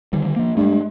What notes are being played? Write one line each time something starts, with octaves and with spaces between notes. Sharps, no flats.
D3 D#3 G3
F3 A#3
G2 G#3 A3